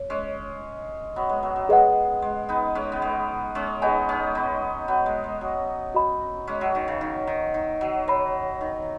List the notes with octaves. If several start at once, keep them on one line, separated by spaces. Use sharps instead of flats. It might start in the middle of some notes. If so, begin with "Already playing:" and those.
Already playing: C#5
G#3 C#4
F#3 B3
G#3
F#3
F#3
G#3 G#4 B4 D#5 F#5
G#3
B3 D#4
G#3 C#4
B3
G#3
G#3 C#4
B3 D#4 G#4 D#5 G#5
G#3 C#4
B3 D#4
F#3 B3
G#3
G#3
F#3
F#4 D#5 B5
G#3 C#4
F#3
D#3
C#3
D#3
D#3
D#3
F#3
F#3 C#5 B5
D#3